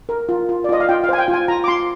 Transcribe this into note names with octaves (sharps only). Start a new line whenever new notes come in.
A#4
F4
F4
D5
F4 D#5
F5
F4 G5
F5
C5 G#5
G5
F4
G#5
F4 A#5
D6
F4 C6